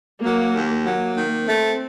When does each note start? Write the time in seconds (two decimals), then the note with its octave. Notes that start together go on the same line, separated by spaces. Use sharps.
0.23 F#3 A#3
0.54 D#2
0.84 F#3 A#3
1.15 D#3
1.46 A3 C4